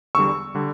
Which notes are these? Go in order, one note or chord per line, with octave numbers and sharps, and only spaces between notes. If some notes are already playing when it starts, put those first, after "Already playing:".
E2 D3 G3 C#6 E6
D3 G3